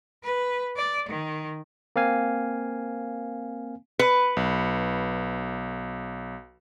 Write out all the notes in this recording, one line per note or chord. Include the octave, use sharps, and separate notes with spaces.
B4
D5
D#3
A#3 C4 F5 G#5
B4 C#7
B1